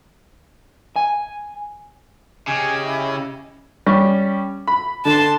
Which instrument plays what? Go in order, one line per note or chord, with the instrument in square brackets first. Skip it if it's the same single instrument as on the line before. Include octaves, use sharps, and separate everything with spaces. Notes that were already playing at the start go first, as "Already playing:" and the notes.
[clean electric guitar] G#5
[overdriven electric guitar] C#3 [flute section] G4 D#5 G#6 [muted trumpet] G#5
[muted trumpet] E4
[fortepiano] G3 C#4
B5
[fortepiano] D3 [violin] A5 C6